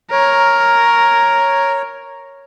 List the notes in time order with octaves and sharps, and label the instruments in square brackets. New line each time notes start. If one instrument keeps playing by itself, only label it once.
[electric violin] A#4 [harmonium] C#5